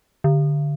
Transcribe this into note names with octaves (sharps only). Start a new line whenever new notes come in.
D3